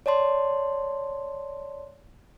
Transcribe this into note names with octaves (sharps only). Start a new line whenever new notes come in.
C#5 D5 A5 C6